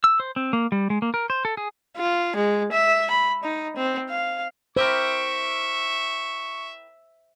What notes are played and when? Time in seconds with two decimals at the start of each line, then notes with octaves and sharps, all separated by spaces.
0.04 E6
0.20 C5
0.36 C4
0.53 A#3
0.72 G3
0.90 G#3
1.02 A#3
1.14 A#4
1.30 C5
1.45 A4
1.57 G#4
1.97 F4
2.36 G#3
2.72 E5
3.11 B5
3.44 D#4
3.77 C4
4.09 F5
4.77 E4 G4 A#4 C5 E5 C#6